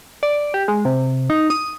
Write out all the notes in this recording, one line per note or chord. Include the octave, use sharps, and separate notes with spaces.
D5
G4
G#3
C3
D#4
D#6